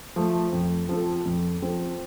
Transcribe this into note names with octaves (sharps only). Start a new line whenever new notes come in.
F3 A3
F2
F3 C4 A4
F2
F3 C4 A4